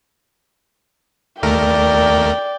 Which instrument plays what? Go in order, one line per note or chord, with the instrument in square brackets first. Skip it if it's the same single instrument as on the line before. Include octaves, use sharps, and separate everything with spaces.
[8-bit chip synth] D#2 A3 A#4 [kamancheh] D5 G5